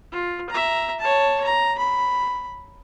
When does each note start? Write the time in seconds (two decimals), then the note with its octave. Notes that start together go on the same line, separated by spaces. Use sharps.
0.12 F4
0.50 E5 A#5
1.00 C#5 A5
1.44 A#5
1.78 B5